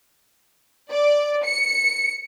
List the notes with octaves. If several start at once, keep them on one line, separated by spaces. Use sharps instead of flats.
D5
C#7